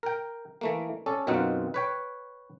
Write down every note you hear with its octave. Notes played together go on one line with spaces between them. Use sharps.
A#4 G5
E3 A3 A#3
C#4 A4 D5
F#2 B2 C4 D#4 F4 F#5
B4 C#5 G5